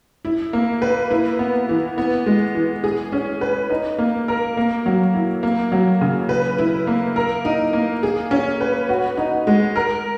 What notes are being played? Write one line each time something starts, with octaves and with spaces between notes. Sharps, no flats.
E4
A#3
B4
E4
B3
E3
B3
G#3
E3
G#4
C#4
B4
D#4
A#3
A#4
A#3
F#3
E4
A#3
F#3
C#3
B4
E4
A#3
A#4
D#4
A#3
G#4
C#4
B4
F#4
D#4
G#3
A#4